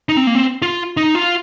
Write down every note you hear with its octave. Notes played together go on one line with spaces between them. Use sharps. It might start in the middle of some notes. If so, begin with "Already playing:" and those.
D#4
C4
A#3
C4
F4
D#4
F4